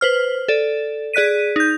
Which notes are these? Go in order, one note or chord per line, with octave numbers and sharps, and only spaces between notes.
B4 C5 F6
A4 D5
G#4 D5 F#6 B6 D#7
D#4 G6